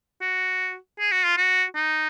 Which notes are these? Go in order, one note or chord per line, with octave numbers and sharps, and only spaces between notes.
F#4
G#4
F#4
F4
F#4
D#4